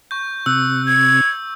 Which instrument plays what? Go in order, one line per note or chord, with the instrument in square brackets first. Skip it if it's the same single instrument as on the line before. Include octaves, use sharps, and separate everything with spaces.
[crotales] C#6 G6
[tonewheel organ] C3 [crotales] E6 [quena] F#6
[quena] G#6